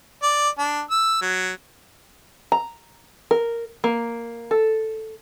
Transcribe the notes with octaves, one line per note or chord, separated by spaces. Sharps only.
D5
D4
E6
F#3
A#5
A#4
A#3
A4